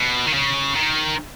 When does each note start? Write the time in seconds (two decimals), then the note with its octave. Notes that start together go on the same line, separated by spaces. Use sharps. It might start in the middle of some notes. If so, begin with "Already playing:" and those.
Already playing: B2
0.27 D#3
0.33 C#3
0.76 D#3